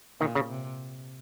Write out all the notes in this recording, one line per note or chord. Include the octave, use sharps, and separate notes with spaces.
A#2 D#3
C#3
C3